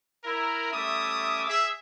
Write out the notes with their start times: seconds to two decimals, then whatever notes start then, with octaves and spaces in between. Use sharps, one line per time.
0.24 E4 A#4
0.71 G3 A3 C#4 E5 D6 D#6
1.48 G#4 E5